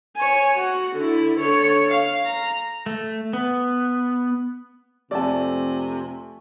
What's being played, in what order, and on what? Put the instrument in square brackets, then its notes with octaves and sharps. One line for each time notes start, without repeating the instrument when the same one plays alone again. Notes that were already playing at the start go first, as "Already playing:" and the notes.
[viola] C#5 G#5
F#4
D3 E4
D3 C#5
F5
A#5
[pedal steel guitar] A3
B3
[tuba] F2 [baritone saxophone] C3 [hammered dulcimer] A3 G#5 [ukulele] D5 A5